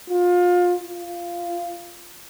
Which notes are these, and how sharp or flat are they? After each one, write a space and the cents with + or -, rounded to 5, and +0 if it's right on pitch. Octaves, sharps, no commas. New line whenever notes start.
F4 +25
F4 -10